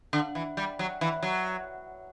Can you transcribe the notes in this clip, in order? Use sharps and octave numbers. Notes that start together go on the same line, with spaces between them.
D3
E3
G3
F#3
E3
F#3